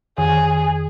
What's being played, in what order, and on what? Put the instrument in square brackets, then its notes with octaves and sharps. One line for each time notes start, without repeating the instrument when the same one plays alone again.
[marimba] F2 D#3 [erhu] G#4